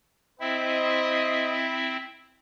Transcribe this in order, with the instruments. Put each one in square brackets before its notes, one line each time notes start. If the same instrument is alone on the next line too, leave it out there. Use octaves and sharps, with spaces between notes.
[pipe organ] C4 E4 E5 [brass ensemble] C5 D#5